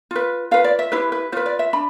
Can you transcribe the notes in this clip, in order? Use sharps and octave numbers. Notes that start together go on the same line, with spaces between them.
F4 B4
F4 B4 F5
D5
E5
E4 G4 B4 C5
B4
F4 B4 C5
D5
E5
D4 B5